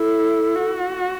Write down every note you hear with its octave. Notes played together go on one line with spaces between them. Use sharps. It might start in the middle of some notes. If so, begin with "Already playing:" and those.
Already playing: E4 A4
F#4